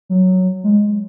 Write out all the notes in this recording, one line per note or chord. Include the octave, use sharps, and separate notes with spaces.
F#3
G#3